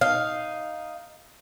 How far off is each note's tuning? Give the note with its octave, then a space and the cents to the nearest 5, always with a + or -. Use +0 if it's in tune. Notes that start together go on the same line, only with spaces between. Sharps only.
D#4 +0 F5 +0